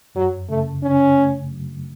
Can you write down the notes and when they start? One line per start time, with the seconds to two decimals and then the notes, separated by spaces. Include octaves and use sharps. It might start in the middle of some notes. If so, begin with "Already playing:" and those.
0.15 F#2 F#3
0.49 C#3 A3
0.83 C#3 C#4
1.17 A3
1.51 F#3